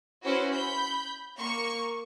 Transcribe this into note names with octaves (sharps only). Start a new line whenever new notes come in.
C#4 E4 F#4 B4 C5
B5 G6
A#3 C#6